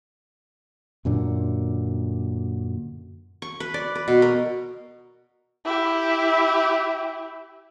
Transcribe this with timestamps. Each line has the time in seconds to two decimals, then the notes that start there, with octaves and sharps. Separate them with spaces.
1.05 F#2 A#2 D3
3.42 C#6
3.60 B4
3.74 D5
3.95 B4
4.08 B2
4.22 A#4
5.65 E4 G4